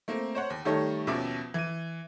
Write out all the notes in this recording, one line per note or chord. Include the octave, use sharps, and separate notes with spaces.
A3 A#3 C4
C5 C#5 F#5
D#2
D#3 G3 A3 D#4 A4 C#5
D#2 B2 F3 C#4 E5 D6
E3 D#7